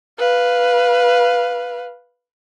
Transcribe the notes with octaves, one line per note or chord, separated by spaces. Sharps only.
B4 F5